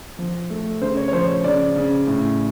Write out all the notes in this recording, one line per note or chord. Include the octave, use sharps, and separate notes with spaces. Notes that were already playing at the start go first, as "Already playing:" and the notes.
F3
A3
C#3 C5
C#5
C#5
F3 C5
C#5
C#3 D5
C#3
A2